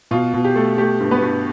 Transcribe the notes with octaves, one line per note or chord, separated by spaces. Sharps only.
B2 F4
B2
G4
A3
A3 G4
G2
B3 B4
G2